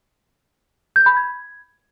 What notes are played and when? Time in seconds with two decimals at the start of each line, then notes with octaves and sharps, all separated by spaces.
0.96 G6
1.06 B5
1.17 G#6